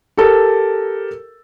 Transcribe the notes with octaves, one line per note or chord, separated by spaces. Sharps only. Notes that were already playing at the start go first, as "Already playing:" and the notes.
G4 A4 A#4